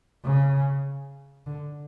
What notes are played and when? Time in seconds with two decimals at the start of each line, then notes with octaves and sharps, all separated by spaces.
0.24 C#3
1.46 D3